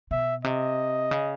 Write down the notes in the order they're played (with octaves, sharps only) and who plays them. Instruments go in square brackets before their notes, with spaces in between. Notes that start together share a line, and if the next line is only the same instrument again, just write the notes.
[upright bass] B2 [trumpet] E5
[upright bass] C3 [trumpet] D#5
[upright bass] C#3